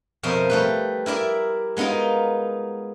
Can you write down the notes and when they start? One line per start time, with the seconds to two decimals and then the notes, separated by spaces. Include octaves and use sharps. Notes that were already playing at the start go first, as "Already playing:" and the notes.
0.23 F2 B2 A#4 C5 D#5 E5
0.50 G3 A3 B4
1.06 E4 A#4 D5 E5
1.77 G#3 B3 D#4 F4 A#4